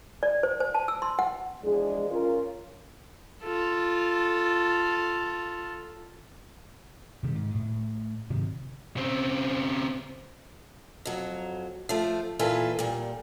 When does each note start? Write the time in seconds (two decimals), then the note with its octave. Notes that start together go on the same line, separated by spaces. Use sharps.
0.23 D5
0.43 C5
0.60 C5
0.74 A5
0.88 E6
1.02 C6
1.19 F#5
1.63 E2 F3 G#3 D4 G#4
2.10 C#4 F4 A#4
3.43 F4 A4
7.23 C3 D#3 F3 G3
7.35 G#2
7.54 A2
8.30 G#2 C3 D#3 F#3
8.97 C#3 C4
11.05 F2 F#3
11.89 F3 A3
12.39 A#2 E3 F4 A4 B4
12.79 A#2 G3